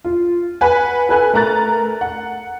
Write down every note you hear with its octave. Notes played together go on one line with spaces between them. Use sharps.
F4
B4 F#5 G#5
A4 B4 G#5 F#6
A3 A#4 A#5 F#6 A6
F#5